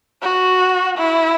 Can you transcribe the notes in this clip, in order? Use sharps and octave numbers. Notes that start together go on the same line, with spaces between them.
F#4
E4